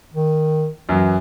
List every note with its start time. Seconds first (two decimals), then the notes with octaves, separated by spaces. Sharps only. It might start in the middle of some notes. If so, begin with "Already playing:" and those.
0.14 D#3
0.89 F#2 E3 F#3